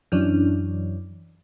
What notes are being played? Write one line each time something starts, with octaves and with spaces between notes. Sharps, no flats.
F#2 E3 C#4 D4